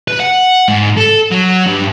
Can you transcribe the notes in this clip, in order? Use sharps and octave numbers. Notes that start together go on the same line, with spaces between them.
B4
F#5
G#2
A4
F#3
G2